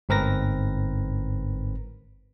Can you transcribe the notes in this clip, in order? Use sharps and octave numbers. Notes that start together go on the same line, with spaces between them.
G1 G#2 C4 A#4 B4 A#6